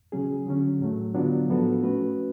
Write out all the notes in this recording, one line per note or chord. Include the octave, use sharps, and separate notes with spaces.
C#3 F#3 C#4 G#4
D3 F#3 C#4
A2 F#3 A3
D3 F#3 B3 D4 F4
A2 F3 B3 F#4 A4
A3 C#4 F#4 B4